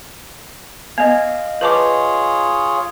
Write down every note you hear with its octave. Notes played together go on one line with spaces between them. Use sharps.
B3 D#5 F5
F4 G#4 B4 C#5 A5 D6